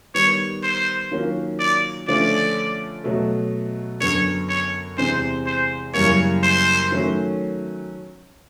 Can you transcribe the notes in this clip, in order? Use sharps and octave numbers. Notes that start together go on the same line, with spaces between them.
D#3 G3 B3 C#5
C5
D#3 F#3 A#3 C#4 F4
D5
D3 F3 A3 C#4 D5
B2 F#3 A3
F#2 D3 F#3 B3 C#5
C#5
E2 C3 E3 G#3 C4 C5
C5
F#2 C#3 E3 G3 A#3 C#5
C5
D#3 F#3 A3 C#4